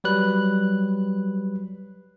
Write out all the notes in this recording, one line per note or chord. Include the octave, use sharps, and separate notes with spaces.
F#3 G3 B4 F#6